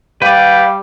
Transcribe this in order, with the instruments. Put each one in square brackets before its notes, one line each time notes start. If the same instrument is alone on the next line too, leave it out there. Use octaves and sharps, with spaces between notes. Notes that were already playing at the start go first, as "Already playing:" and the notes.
[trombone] G3 [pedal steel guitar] B4 D5 [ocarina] F5 [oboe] G5